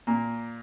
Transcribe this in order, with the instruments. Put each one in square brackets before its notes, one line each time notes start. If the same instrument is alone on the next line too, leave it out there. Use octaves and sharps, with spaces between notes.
[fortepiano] A#2 A#3